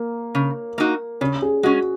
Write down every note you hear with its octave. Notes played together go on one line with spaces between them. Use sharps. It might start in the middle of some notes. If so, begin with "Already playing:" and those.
Already playing: A#3
C#3
A#3 D#4 F#4
C#3 C#4
G#4
G#3 C#4 F#4